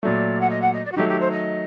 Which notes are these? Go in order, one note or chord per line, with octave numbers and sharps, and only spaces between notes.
A#2 F#3 A3 D5
F#5
D#5
F#5
D#5
D5
F#4
D#3 F#3 A3 G4
G4
C5
D#5